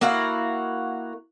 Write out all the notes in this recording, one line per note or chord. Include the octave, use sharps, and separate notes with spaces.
A#3 E4 F#4 F5